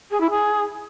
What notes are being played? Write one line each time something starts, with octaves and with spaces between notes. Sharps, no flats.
G#4
E4
G#4